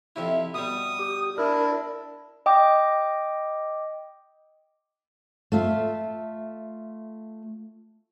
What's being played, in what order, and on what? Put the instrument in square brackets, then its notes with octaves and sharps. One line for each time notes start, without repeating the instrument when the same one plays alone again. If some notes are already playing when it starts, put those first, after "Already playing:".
[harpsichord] F2 C3 E4
[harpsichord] B2 G3 [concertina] D#6
[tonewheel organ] G4
[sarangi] D4 [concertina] E4 [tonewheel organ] A#4
[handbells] D#5 G5 D6
[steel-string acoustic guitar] A3 F4 E5